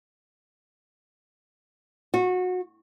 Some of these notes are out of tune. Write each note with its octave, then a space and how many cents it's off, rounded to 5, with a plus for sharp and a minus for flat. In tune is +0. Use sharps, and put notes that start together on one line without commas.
F#4 -25